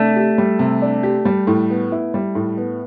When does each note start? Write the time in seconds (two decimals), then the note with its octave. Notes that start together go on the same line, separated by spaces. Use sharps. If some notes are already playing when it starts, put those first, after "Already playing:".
Already playing: C3 A3 D4
0.16 G4
0.38 G3
0.59 C3
0.82 D4
1.03 G4
1.25 G3
1.47 A2
1.70 B3
1.92 E4
2.14 G3
2.35 A2
2.57 B3